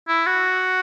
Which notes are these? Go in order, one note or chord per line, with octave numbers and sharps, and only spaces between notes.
E4
F#4